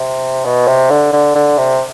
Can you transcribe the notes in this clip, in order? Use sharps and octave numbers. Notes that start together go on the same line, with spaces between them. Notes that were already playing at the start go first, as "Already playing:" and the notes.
Already playing: C3
B2
C3
D3
D3
D3
C3